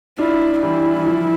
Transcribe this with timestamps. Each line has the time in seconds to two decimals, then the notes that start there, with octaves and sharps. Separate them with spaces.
0.18 D4 E4 F4
0.62 E3 G3 E4
0.96 E3
1.06 F3